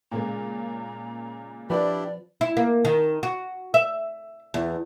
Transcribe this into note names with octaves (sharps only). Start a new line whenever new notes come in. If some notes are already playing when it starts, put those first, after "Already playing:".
A#2 C#3 G#3 A#5
F3 D4 E4 G4 B4 D5
E4
A#3
D#3
F#4
E5
E2